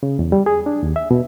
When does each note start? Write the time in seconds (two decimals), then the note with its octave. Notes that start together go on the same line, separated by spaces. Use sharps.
0.03 C#3
0.19 E2
0.32 G3
0.46 G#4
0.66 D4
0.83 D#2
0.96 E5
1.11 B2